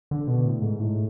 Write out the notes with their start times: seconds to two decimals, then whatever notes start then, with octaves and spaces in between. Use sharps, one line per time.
0.11 D3
0.27 B2
0.45 A2
0.61 G#2
0.79 A2